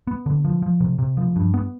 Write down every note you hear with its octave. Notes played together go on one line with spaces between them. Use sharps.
B3
D3
F3
F3
C3
C3
F3
G2
B3